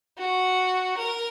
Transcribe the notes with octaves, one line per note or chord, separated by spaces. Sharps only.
F#4
A#4